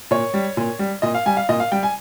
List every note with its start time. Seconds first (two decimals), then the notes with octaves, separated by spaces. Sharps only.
0.11 A#2 C#5
0.34 G3
0.57 A#2
0.79 G3
1.02 A#2 D#5
1.15 F5
1.26 G3 G#5
1.37 F5
1.49 A#2 D#5
1.60 F5
1.72 G3 G5
1.83 G#5